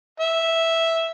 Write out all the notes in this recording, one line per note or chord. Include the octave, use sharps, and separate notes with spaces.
E5